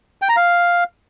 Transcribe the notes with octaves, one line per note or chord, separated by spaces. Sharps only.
G5
A#5
F5